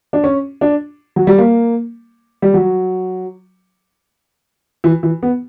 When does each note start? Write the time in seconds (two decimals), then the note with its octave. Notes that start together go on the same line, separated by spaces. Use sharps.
0.13 D4
0.24 C#4
0.61 D4
1.16 F#3
1.27 G3
1.38 A#3
2.42 G3
2.54 F#3
4.84 E3
5.03 E3
5.23 B3